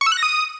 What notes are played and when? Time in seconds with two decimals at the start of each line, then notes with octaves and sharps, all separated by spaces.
0.01 C#6
0.06 E6
0.12 F#6
0.17 A#6
0.23 D#6